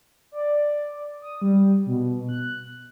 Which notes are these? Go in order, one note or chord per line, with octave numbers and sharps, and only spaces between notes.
D5
D#6
G3
B2
F#6